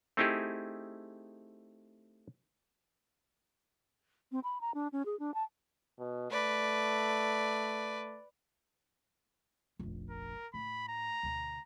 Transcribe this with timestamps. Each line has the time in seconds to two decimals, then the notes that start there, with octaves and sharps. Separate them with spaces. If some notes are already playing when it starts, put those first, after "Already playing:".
0.17 A3 C4 D#4 E4 G4 G#4
4.32 C4
4.44 B5
4.61 A#5
4.74 D4
4.92 C#4
5.06 G#4
5.19 D4
5.34 A5
5.99 B2
6.31 A3 B4 D5
9.79 F1 A#1
10.10 A#4
10.54 A2 B5
10.89 A#5
11.23 D2 B2